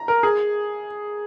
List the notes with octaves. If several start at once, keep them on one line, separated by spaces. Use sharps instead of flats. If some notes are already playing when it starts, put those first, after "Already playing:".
Already playing: A#5
A#4
G#4